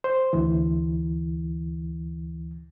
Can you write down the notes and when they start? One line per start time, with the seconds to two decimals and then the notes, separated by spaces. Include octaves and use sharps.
0.04 C5
0.33 D2 E3